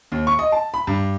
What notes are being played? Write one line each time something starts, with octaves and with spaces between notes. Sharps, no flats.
D#2
C#6
D#5
A5
B5
G2